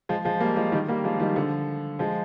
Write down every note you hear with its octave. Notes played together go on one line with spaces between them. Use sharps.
F3 G#3
F3 G#3
G3 A#3
F3 G#3
D#3 G3
G3 A#3
F3 G#3
D#3 G3
D3 F3
F3 G#3